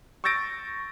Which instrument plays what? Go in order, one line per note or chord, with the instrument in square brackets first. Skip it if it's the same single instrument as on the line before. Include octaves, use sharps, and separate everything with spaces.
[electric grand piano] C#6 E6 G6 A6 A#6 D7